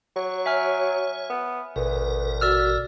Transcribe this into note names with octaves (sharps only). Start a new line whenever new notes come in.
F#3 C#5
E5 G#5 F6
B3
A1 D2 B2 A#4 B4
F#4 D5 E6 F6